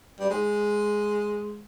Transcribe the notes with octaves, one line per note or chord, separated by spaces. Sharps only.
G3
G#3